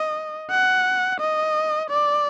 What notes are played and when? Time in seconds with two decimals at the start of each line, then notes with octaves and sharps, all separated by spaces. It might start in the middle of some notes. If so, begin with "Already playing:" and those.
Already playing: D#5
0.51 F#5
1.20 D#5
1.90 D5